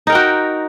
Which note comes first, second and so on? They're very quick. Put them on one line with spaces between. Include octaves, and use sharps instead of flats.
D#4 A#4 G5 F#4